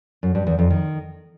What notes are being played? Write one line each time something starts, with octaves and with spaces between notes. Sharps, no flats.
F#2
G2
E2
F2
D#3